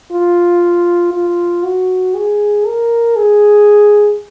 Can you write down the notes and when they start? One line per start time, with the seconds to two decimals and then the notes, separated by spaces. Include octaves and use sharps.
0.12 F4
1.14 F4
1.65 F#4
2.16 G#4
2.67 A#4
3.17 G#4